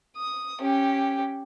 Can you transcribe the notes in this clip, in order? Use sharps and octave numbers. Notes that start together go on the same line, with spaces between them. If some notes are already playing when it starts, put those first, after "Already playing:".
D#6
C#4 G4